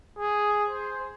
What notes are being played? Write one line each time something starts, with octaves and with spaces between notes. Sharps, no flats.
G#4
C5